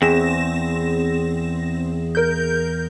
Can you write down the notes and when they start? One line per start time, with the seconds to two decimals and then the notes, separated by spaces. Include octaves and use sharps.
0.02 E2 C4 G#4 A#6 E7
2.15 A#4 G6